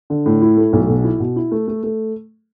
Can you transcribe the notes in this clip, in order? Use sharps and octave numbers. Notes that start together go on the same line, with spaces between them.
D3
A2
E4
A3
B1
B2
E4
B2
E4
A3
A3
A3